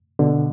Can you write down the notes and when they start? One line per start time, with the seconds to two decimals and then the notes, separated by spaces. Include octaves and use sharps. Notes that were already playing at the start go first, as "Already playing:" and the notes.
0.19 B2 D3